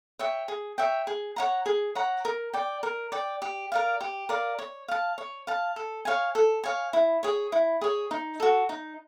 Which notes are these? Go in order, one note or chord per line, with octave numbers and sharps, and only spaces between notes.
C#5 E5 G5
G#4
C#5 E5 G5
G#4
C#5 F#5 A#5
G#4
C#5 F#5 A#5
A#4
D5 G5
A#4
D5 G5
G4
A#4 D5 F5
G4
A#4 D5 F5
C#5
F5 A5
C#5
F5 A5
A4
C#5 F5 G#5
A4
C#5 F5 G#5
E4
G#4 C#5
E4
G#4 C#5
D#4
F#4 A4
D#4